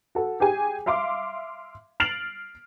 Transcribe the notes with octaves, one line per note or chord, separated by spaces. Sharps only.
F#4 A4
G4 G#4 G5 G#5
E5 F5 C6 D6
F6 A6 C7 D7 F7 F#7